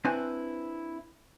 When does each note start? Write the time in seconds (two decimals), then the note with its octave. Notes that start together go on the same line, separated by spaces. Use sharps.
0.05 C4 D4 E4 B4 C5 G#5